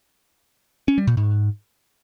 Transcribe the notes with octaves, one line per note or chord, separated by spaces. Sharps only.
C#4
G3
A#2
G#2